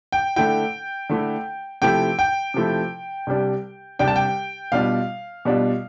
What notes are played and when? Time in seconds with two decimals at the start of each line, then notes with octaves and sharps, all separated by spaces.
0.12 G5
0.36 D3 A3 E4 G5
1.09 D3 A3 E4
1.82 C3 F3 A3 E4 G5
2.19 G5
2.54 C3 F3 A3 E4
3.27 C2 C3 G3 D4
3.99 C2 C3 G3 D4 G5
4.08 A5
4.16 G5
4.72 B2 G3 D4 F4 F5
5.45 B2 G3 D4 F4